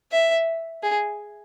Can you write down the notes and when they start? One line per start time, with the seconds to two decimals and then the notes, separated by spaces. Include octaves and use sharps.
0.12 E5
0.83 G#4